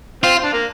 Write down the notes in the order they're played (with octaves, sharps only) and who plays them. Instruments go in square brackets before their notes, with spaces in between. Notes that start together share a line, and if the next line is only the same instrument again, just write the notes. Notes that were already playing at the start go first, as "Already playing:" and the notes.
[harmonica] C4 [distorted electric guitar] F4
[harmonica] D4
A#3